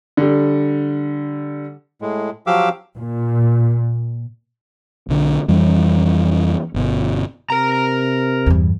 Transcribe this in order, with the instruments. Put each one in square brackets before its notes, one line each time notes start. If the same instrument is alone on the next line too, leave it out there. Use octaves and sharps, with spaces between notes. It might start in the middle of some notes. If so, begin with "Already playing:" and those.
[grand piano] D3 G3
[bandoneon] A2 G#3
F3 F#3 G4 F5 D6 E6
[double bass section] A#2
[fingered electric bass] B1 D3
F2 E3 G3 C#4
G1 B2
[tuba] C3 [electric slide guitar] A#4 A#5
[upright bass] E2 G2